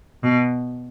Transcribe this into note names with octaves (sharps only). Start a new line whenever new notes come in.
B2